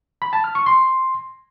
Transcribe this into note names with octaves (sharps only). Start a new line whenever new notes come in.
B5
A5
F6
C#6
C6